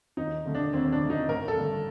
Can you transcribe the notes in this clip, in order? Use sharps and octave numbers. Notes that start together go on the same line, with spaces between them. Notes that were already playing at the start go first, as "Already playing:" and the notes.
D#2 D#4
D3 A3
D4
D#2 C4
D4
D3 A3
D#4
A1 A#4
A4
G2 D3 A3